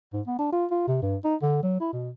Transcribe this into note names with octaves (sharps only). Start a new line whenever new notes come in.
G#2
B3
D4
F4
F4
C3
G2
D#4
D3
F#3
E4
B2